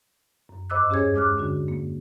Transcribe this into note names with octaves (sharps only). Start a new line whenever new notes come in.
F#2
G2 C5 D#5 D6 E6 F#6
E2 C#4 G4 G#4 C#5 G#6
G#3 D6 F6 F#6
D3 D4 F#4
A#3